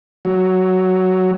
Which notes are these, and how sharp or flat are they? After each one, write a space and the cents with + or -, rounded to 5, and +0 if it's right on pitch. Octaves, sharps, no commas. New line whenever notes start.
F#3 +5